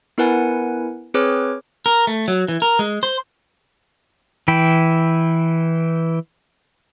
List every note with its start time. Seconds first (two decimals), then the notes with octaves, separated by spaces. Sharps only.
0.18 B3 E4 A#4 B4 F#5 G#5
1.14 C4 G#4 B4 C#5 D6 F6
1.86 A#4
2.07 A3
2.28 F#3
2.48 E3
2.62 A#4
2.79 G#3
3.03 C5
4.48 E3 E4 G5